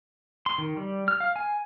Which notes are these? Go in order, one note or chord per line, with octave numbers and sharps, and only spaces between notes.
C6
D#3
G3
F6
F5
G#5